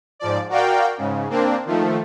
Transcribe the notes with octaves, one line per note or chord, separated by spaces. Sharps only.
G#2 F3 D5
F#4 A#4 D5 F5 G5
G#2 C#3
A#3 C4 D4
D#3 F3 A3